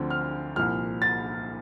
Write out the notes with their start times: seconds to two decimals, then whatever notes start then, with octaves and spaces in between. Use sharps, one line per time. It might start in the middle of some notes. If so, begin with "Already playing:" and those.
Already playing: D2 D3 F3 C4
0.10 F6
0.56 C2 A#2 F3 F6
1.02 A6